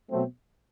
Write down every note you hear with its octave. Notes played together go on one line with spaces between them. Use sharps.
B2 F#3 A3 C4